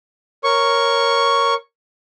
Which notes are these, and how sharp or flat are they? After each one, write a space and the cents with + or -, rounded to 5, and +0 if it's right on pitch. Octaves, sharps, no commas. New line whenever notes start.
A#4 +0 C#5 +0 C#6 +0